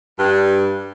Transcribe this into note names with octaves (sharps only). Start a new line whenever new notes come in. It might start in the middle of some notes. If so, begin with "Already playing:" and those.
G2